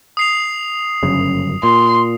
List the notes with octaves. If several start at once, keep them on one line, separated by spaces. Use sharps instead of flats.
D#6 C7 F7
G1 F#2 C#3
A#2 C6